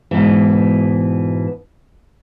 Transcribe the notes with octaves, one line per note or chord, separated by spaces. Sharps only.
G#2 B2 E3